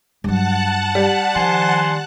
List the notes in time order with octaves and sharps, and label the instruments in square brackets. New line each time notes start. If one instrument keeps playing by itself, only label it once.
[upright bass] G2 F#3 [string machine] F#5 A5 F#6
[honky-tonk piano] G3
[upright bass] D#3 [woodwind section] F3 G#5 C6